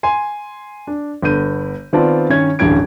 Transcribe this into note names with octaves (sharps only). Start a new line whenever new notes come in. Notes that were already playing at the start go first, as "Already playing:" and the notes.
G#5 C6
D4
G1 B3 G6 D#7
D#3 B3 C4 F4 D5 A5
G2 D#3 C#4 C#5 G#6
D1 A1 G2 C#4 G#6 D7